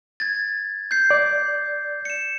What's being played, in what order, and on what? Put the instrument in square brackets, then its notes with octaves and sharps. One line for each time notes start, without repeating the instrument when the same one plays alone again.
[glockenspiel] G#6 A6
G6 C7
[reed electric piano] D5
[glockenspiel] C#7 E7